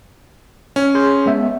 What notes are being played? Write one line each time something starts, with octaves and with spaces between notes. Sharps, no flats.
C#4
G#4 C6 G6
G#3 B3 E5